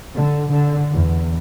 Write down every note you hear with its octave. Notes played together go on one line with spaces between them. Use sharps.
D3
D3
E2